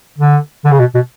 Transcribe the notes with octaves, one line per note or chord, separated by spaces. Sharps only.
D3
D3
C#3
B2
B2